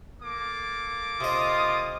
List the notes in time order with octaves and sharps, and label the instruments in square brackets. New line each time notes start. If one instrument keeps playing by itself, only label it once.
[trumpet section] A#3 A4 D6
[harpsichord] C3 D#5 [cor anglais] F4 [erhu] D#6